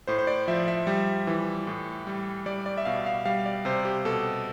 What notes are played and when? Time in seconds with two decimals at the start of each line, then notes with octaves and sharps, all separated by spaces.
0.07 A2 C5
0.19 C5
0.27 D5
0.48 F3 E5
0.68 E5
0.87 G3
1.27 E3
1.67 A2
2.07 G3
2.46 G3 D5
2.66 D5
2.78 E5
2.85 B2 F5
3.06 F5
3.26 G3 F5
3.46 D5
3.65 C3 C5
3.85 G4
4.05 B2 A4